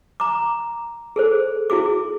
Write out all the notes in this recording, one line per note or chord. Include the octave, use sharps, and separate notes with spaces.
A#5 D6
G#4 A4 C5
E4 F#4 G#4 D6